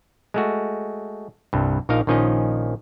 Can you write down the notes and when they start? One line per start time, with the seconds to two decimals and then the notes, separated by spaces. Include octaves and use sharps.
0.34 G#3 A3 F#4
1.53 C2 G2
1.89 A#1 F3 D#4 A#4 F5
2.07 A#1 D#3 F3 C#4 D#4 D#5